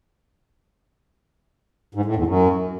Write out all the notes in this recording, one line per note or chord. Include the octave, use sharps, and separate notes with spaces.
G#2
A2
E2
F#2